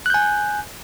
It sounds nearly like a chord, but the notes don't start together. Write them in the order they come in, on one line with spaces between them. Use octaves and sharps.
F#6 G6 G#5